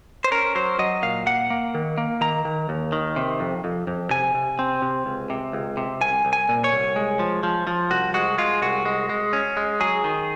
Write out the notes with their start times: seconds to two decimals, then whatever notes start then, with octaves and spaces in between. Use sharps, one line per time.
0.24 C5
0.32 C#4 A#4
0.55 F#3 C5
0.79 F#3 D#5
1.03 A#2 F5
1.26 A#3 F#5
1.50 A#3
1.75 D#3
1.98 A#3
2.21 D#3 A#5
2.45 D#3
2.69 D#2
2.92 D#3
3.16 C3
3.40 F2
3.64 F2
3.87 F2
4.11 C3 G#5
4.35 C3
4.59 C4
4.82 C3
5.06 C#2
5.30 C3
5.53 C#2
5.77 C3
6.01 C2 G#5
6.25 C2
6.33 G#5
6.49 A#2
6.64 C#5
6.72 C2
6.96 G#3
7.19 F3
7.43 F3
7.67 F3
7.91 C2 F#4
8.14 G#3 F#4
8.38 G#3 F4
8.62 C2 F#4
8.85 G#3
9.09 G#3
9.33 C#4
9.57 G#3
9.80 F#3 G#4
10.04 D#3